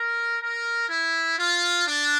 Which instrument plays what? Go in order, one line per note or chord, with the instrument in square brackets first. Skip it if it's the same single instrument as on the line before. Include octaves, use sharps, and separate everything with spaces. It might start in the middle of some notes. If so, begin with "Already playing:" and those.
Already playing: [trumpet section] A#4
A#4
E4
F4
D4